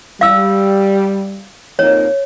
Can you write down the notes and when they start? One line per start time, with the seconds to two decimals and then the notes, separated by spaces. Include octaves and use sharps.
0.21 G3 F5 E6
1.79 F2 A#3 D#4 C#5